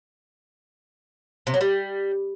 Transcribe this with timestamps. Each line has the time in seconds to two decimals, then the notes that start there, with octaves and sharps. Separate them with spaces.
1.47 C3
1.54 F#3
1.61 G3